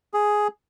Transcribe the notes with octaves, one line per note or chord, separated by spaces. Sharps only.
G#4